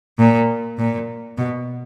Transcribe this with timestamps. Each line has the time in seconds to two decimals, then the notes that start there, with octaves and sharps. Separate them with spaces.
0.19 A#2
0.78 A#2
1.38 B2